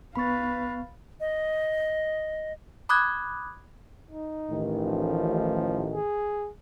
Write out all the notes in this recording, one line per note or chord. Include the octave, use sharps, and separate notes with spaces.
C2 B3 B4 F5 B5 C#6 A6
D#5
B5 D6 D#6 F#6 G#6
D#4
A1 D#3
F3
G#4